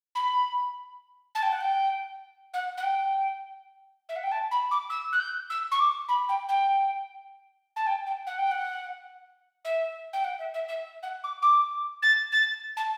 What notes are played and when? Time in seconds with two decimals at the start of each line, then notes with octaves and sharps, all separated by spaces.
0.15 B5
1.35 A5
1.43 G5
1.52 F#5
1.61 G5
2.54 F#5
2.77 F#5
2.83 G5
4.09 E5
4.16 F#5
4.24 G5
4.32 A5
4.51 B5
4.71 D6
4.90 E6
5.12 F#6
5.20 G6
5.50 E6
5.72 C#6
5.80 D6
6.09 B5
6.29 G5
6.49 G5
7.76 A5
7.87 G5
8.06 G5
8.27 F#5
8.39 G5
8.51 F#5
9.65 E5
10.13 G5
10.24 F#5
10.39 E5
10.54 E5
10.68 E5
11.03 F#5
11.24 D6
11.42 D6
12.02 A6
12.32 A6
12.77 A5